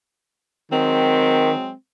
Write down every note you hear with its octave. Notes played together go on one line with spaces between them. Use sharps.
D#3 F#3 G#3 C4